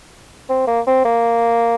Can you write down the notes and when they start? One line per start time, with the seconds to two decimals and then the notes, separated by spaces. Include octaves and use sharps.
0.49 C4
0.67 A#3
0.87 C4
1.05 A#3